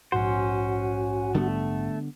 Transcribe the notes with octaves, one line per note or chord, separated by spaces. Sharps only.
A#1 G#2 C#4 F#4 C5 F#5
D3 G3 A3 B3